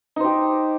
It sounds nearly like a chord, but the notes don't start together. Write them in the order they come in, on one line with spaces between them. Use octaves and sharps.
D#4 C5 G4